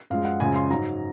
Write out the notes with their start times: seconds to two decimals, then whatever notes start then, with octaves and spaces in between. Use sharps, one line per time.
0.10 F#2 F3 G#3 F5
0.25 F#5
0.40 F#2 C#3 F3 G#3 G#5
0.55 C6
0.70 G#2 F#3 A#5